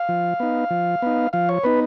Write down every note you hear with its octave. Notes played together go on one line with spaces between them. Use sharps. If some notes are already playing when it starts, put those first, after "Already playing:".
Already playing: F5
F3
B3 D#4
F3
B3 D#4
F3 F5
C#5
B3 D#4 B4